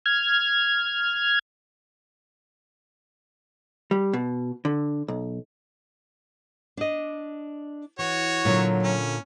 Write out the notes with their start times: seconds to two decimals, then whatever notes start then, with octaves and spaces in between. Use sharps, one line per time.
0.06 F6 G#6
3.91 G3
4.13 B2
4.65 D3
5.08 B1
6.77 D4 D#5
7.99 E3 F#4 C#5
8.45 A#2 D3 F#3
8.83 C#4